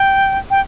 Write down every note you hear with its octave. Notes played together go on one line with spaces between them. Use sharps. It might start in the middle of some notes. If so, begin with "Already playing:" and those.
Already playing: G5
G5